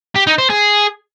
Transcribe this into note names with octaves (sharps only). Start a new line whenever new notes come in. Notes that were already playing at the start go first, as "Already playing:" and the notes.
G4
D#4
C5
G#4